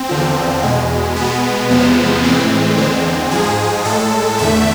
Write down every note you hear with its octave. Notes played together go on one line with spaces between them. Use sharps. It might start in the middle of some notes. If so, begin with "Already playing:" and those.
Already playing: C4
E2 D3 F3
E2 B2 G#3
B2 G#3 B3
E2 C3 F3 G#3
A2 E3 G#3 C4
E2 D3 G#3 C4
G#2 F3 G#3 G#4
A2 G#3 A4
E2 D3 A3 E5